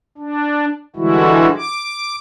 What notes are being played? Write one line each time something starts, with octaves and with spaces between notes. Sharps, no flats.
D4
D3 E3 G3 G#3 E4 F#4
D6